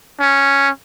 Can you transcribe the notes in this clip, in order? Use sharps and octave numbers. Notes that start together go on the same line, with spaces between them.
C#4